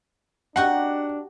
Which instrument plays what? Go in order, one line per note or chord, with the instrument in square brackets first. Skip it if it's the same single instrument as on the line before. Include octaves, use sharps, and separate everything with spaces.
[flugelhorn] D4 [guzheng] D#4 F#4 G4 [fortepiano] F#5